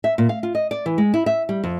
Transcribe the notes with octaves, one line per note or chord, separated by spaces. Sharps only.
E5
A#2
F5
F4
D#5
D5
E3
G#3
E4
E5
G3
F2